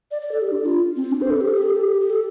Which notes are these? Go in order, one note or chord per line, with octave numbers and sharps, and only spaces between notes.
D5
D5
A4
G4
D4
F4
C4
D4
C5
A4
G4
A4
G4
A4
G4
A4
G4
G4
A4